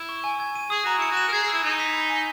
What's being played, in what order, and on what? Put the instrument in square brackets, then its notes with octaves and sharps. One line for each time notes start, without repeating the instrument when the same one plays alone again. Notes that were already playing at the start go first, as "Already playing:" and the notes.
Already playing: [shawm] E4
[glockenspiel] C#6
G#5
G#6
D#7
[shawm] G#4 [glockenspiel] D#6
[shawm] F#4 [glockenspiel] A#5
[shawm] E4 [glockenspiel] C#7
[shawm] F#4
[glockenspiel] E7
[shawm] A#4
[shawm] G#4 [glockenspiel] G#6
[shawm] G#4
[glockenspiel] E6
[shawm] E4
[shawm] D#4 [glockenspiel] E6
[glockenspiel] B6
B5
G#5